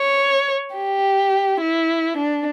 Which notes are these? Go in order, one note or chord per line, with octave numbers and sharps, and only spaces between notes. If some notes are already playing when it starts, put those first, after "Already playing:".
Already playing: C#5
G4
E4
D4